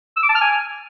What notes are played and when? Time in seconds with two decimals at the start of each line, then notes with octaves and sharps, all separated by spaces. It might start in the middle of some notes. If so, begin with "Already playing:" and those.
0.17 E6
0.23 D6
0.29 A5
0.35 F6
0.41 G#5